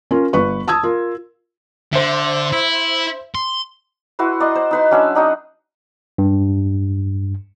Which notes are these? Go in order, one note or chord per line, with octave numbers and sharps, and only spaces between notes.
C#4 F4 A#4
G1 B4 C#6
A5 D#6 E6 G#6
F4 A#4
D3 C5 E5
E4
C6
E4 F#4 B4 C6
D5 D#5 A#5 C6
C5
D#4 B4 C6
F#3 C#4 D4 E5
D4 D#4 F#4 D#6
G2